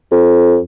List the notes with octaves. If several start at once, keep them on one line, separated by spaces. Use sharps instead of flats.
F2